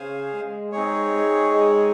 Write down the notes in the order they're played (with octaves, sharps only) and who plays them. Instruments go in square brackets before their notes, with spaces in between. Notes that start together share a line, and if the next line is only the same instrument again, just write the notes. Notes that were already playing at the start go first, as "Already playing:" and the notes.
Already playing: [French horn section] C#3 [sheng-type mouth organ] G#4 C5 F5 G#5
[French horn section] G#3
[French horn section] G#3 [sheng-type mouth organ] C4 D#4 G#4 C#5
[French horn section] G#3
G#3